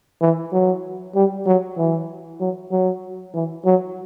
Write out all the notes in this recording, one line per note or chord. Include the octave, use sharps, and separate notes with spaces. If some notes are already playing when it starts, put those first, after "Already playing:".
E3
F#3
G3
F#3
E3
F#3
F#3
E3
F#3